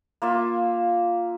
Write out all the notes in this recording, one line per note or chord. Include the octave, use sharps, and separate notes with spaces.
A#3 F4 E5